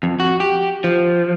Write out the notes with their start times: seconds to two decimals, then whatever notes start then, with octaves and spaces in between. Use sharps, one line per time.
0.03 F2
0.20 F#4
0.40 G4
0.84 F3